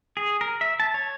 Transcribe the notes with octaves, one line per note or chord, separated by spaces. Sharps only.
G#4
A#4
E5
A5
C#5